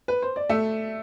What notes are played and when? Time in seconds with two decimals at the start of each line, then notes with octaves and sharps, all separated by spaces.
0.08 B4
0.22 C5
0.36 D5
0.49 A3 E5